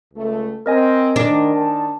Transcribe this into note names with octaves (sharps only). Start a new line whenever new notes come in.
C#2 A3
C4 A#4 D#5 G#5
D#3 D4
D#3 A5